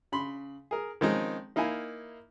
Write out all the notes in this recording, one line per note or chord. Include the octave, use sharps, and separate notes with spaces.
C#3 B5 C6
G#4 A#4
D#3 F3 G#3 C4 C#4 D#4
A#3 D#4 E4 F5 G#5